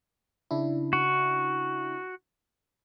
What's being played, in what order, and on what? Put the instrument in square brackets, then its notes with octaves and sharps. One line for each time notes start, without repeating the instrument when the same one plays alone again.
[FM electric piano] C#3 D4 E4
[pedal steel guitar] F#4